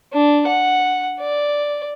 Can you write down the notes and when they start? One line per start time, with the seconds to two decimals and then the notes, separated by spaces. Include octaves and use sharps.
0.13 D4
0.47 F#5
1.20 D5